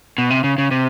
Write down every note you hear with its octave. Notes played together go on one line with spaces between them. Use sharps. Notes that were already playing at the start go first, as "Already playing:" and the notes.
B2
C3
C#3
C#3
C3